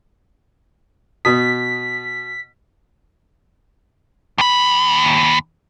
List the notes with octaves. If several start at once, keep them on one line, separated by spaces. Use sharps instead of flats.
B2 D#6 B6
D#2 B5